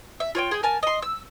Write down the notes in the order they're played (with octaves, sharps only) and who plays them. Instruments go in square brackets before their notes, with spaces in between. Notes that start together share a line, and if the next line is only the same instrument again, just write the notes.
[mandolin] E5
F4 C#5 D5 G5
G#4 G5
A#4 G#5 A5
D#5 C6
E6